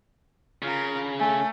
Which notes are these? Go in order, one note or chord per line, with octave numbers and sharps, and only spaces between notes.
C#3 F4 A#4
A3 G#5